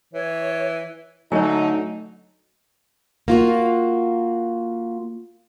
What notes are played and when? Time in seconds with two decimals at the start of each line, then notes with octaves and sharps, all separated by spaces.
0.13 E3 C#5
1.32 D3 F#3 A3 D#4 C#5 D#5 G#5
3.28 A#3 F4 F#4